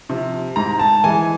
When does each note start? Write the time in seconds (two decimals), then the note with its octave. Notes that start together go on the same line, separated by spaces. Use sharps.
0.09 C3 F3
0.56 G#2 A#5
0.79 A5
1.04 E3 G#3 G#5